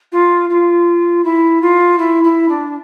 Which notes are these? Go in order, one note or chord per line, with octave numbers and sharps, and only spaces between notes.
F4
F4
E4
F4
E4
E4
D4